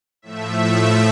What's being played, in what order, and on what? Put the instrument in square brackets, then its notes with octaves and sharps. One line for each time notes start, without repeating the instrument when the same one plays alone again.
[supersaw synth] A2 F3 A3 E5